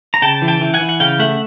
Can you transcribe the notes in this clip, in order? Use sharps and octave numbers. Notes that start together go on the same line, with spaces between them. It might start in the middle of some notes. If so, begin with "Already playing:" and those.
A#5
C#3 G5 A5
E3
G5 A5
E3
F#5 G#5
E3
F#5
C#3 F5 G5
A3 E5 F#5